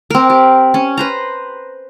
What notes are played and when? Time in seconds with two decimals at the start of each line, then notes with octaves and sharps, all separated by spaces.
0.10 C4 A#4
0.30 G4
0.74 C#4
0.98 B4 C5 A#5